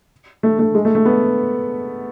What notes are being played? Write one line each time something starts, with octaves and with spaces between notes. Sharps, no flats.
A3
A3
G#3
A3
A3
B3